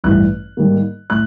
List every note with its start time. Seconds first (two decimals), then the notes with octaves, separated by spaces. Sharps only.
0.04 A1 G2 E3 G3 F#6
0.57 G#2 D#3 G3 A#3
1.10 A2 F#6